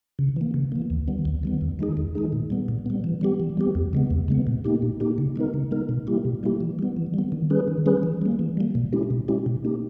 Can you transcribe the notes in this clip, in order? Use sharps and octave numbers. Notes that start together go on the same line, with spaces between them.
C#3
E3 A#3
C#3
E3 A#3
D#2
D#3 G3 B3
D#2
D#3 G3 B3
E2
D#3 G#3 D#4 G#4
E2
D#3 G#3 D#4 G#4
A#2
G3 B3
A#2
G3 B3
E3
G3 B3 G4
E3
G3 B3 G4
E2
C#3 G#3 B3
E2
C#3 G#3 B3
A#2
A#3 D#4 G4
A#2
A#3 D#4 G4
C#3
G#3 B3 D#4 A#4
C#3
G#3 B3 D#4 A#4
B2
G3 A#3 E4 G4
B2
G3 A#3 E4 G4
E3
G3 B3
E3
G3 B3
D#3
G3 C#4 G#4 B4
D#3
G3 C#4 G#4 B4
E3
G3 A#3
E3
G3 A#3
B2
G#3 C#4 E4 G4
B2
G#3 C#4 E4 G4
B2
A#3 D#4 G4